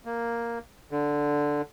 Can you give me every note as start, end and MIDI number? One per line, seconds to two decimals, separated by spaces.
0.05 0.58 58
0.91 1.62 50